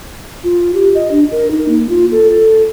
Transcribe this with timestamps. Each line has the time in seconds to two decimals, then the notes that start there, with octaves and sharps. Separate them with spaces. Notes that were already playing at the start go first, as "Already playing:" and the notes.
0.44 F4
0.74 G4
0.95 D#5
1.11 D4
1.32 A#4
1.51 D#4
1.68 A#3
1.89 F4
2.12 A4
2.30 A4